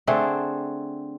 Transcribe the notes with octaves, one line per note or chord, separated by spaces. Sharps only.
D3 A3 C4 G#4